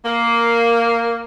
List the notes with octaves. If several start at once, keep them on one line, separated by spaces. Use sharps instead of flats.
A#3